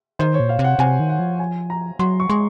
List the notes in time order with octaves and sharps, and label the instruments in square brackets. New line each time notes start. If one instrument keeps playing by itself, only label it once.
[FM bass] D#3 [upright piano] C5
[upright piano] C#5
[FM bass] A#2
[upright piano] F5
[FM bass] C3
[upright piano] F#5
[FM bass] C3 [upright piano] G#5
[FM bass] D#3
[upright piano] F#5
[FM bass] F3
[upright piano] G#5
A#5
[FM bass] F#3 [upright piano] C6
[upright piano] C#6
[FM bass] G#3 [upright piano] C6